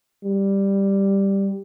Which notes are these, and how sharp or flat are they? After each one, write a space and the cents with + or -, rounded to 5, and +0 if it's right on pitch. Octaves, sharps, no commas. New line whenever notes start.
G3 +5